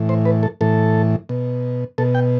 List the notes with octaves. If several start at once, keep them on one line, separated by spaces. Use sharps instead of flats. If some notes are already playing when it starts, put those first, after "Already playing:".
Already playing: A2 E3
C5
B4
A4
A2 E3 A4
B2
B2 A4
G5